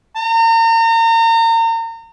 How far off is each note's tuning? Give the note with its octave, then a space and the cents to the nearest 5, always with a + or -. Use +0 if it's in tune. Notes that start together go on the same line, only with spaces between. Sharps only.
A#5 -35